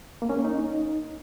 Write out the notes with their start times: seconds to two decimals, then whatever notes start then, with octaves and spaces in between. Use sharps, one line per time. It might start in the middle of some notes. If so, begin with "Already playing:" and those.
0.22 A#3
0.29 C#4
0.37 A#3
0.45 D#4